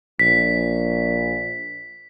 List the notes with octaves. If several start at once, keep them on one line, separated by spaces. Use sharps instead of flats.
A#1 B6